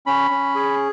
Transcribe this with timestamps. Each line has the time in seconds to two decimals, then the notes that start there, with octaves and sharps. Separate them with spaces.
0.06 C#4 B5
0.31 C#4
0.56 G#4